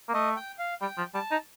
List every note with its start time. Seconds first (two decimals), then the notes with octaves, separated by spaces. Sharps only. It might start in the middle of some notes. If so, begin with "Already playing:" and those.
0.09 A#3
0.14 A3 D#5
0.36 G5
0.59 F5
0.81 G3 G5
0.98 F3
1.14 G3 A5
1.31 D#4